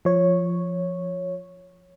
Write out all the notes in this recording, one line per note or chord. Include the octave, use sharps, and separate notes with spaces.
F3 C#5